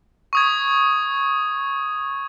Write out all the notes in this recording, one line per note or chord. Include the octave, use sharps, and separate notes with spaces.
C#6 D#6 G#6